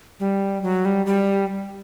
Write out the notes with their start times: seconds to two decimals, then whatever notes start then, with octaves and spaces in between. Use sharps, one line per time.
0.20 G3
0.63 F#3
0.85 G3
1.06 G3